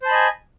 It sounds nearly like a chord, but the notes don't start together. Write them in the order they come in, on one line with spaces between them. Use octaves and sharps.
C5 A5 B5 D#5 G#5